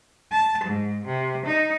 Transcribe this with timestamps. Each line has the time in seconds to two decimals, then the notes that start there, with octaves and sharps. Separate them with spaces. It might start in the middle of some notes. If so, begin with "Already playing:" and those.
0.32 A5
0.65 G#2
1.06 C3
1.45 D#4